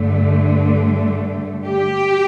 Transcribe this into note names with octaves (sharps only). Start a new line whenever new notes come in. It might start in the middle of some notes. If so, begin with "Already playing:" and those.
Already playing: G2 D3 A3
G4